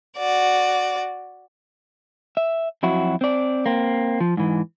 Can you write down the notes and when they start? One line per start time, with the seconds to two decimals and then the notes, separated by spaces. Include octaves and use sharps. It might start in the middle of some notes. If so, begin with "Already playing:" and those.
0.17 F#4 D5
2.37 E5
2.83 F2 F#3 E4 F#4
3.21 C4 D5
3.66 A#3 C4
4.20 F3
4.37 G#2 E3